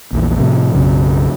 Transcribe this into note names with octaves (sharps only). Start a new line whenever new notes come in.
A#1 E2
A2 C3 F3
B1 F#2 C#3